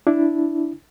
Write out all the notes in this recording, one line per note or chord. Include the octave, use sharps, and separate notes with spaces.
D4 E4